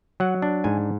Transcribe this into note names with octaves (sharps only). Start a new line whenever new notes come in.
F#3 F#5
D4
G#2 G#5